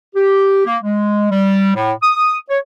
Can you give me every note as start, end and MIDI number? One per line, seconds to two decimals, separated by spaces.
0.16 0.63 67
0.65 0.77 58
0.83 1.27 56
1.31 1.74 55
1.75 1.92 45
2.03 2.36 87
2.50 2.58 73